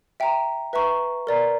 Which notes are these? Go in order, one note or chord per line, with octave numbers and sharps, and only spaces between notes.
E5 G5 A#5
B4 E5 A#5 C#6
A#4 D5 A#5